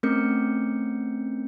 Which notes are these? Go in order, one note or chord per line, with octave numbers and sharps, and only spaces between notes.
A3 C4 C#4 A#4 G6 C#7